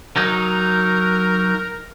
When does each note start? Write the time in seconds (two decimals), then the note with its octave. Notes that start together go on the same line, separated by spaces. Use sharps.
0.16 F#3 D#4 A#4